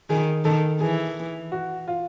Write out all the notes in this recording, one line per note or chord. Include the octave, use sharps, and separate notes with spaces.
D#3 G#4
D#3 A4
E3 G#4
F#4
F4